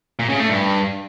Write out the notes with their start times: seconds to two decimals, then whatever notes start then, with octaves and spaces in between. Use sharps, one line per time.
0.19 A#2
0.29 C#3
0.39 A3
0.49 G2